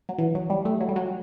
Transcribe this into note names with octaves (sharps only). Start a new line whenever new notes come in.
F#3
E3
F#3
G3
A3
F#3
G3
F#3